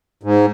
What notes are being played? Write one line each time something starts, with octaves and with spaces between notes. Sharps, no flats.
G#2